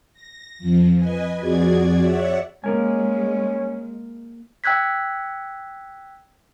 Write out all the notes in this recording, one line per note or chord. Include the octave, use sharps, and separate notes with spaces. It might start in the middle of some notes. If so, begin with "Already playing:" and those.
A#6
F2 F3
B4 D#5 G#5
F2 F#4 G#4 D5 G#6
C#5 D5 E5 F#5
G#3 A#3 C#4 A#4 G#5
G5 E6 F#6 G#6 B6